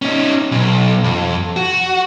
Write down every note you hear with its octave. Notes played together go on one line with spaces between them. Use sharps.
C#4 D#4
B1
F2
F#4